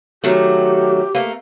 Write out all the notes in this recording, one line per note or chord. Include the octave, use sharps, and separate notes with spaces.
D#3 F#3 A3 G4
A3 A#3